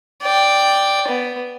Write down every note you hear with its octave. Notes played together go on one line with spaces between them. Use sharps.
D5 G5
B3